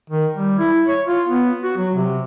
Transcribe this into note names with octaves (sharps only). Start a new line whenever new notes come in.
D#3
G3
E4
C#5
F4
B3
F#4
F#3
C3